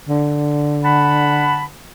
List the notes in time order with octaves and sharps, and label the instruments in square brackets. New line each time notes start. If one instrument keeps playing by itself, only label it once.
[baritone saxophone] D3
[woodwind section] F#5 A5 B5